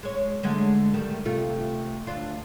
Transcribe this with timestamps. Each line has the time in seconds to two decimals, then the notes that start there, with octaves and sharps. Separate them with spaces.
0.03 G#3 C#5
0.43 D3 G#3 A3
0.94 D#3 G3 A3
1.25 C3 A3 F4
2.07 D2 D4 F4